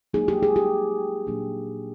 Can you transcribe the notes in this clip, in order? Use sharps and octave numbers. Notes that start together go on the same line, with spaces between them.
F#3 A#3 D#4 G#4
G4
G#4
G4
A#2 F#3 A#3 D4